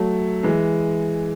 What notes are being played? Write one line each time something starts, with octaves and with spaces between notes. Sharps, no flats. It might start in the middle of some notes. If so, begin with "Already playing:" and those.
Already playing: F#3 A3
E3 G#3